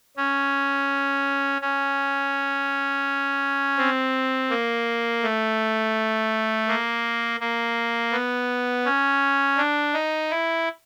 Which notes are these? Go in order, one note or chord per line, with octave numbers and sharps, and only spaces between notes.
C#4
C#4
C4
A#3
A3
A#3
A#3
B3
C#4
D4
D#4
E4